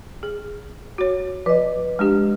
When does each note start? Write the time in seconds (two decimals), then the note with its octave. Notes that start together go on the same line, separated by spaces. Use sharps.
0.23 G#4
0.98 F#4 C#5
1.46 F3 B4 D#5
1.99 G#3 D4 G4